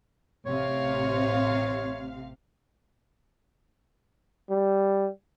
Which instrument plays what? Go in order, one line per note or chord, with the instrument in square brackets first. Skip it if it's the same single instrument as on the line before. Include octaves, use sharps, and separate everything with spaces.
[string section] A1 C3 F5 [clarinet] C#5
[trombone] G3